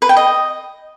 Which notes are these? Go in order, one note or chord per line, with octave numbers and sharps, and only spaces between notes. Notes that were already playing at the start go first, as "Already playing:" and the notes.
B4
G5
D#5